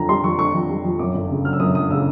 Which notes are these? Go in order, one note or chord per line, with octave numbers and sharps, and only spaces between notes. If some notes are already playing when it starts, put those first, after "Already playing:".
Already playing: F2 D3 A#5
G3 C6
F2 C#6
D3 C#6
F2
G3
F2
F#2 D6
G1
C#3
F#3 F6
E6
F#2 D#6
G1 D#6
C#3 E6